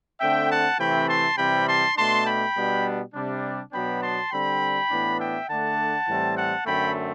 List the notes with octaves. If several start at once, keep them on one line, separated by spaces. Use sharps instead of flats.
D3 A3 C4 E5 G5
F#5 A5
C3 E3 A3 C4 G5 B5
A5 C6
C3 E3 G3 C4 G5 B5
A5 C6
B2 A3 D4 A5 C6
G5 B5
B2 G3 B3 D4
C3 G3 D4
B2 F#3 B3 D4 G5 B5
A5 C6
D3 G3 C4 G5 B5
A2 E3 B3 D4
E5 G5
D3 A3 D4 F#5 A5
A2 E3 G3 C4
F#5 A5
F#2 D3 A3 C4 G5 B5